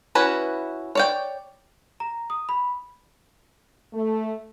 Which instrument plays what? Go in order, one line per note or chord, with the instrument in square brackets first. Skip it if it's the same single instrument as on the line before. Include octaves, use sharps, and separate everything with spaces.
[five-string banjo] C#4 E4 F#4 B4
C#5 D5 G5
[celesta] A#5
D#6
B5
[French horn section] A3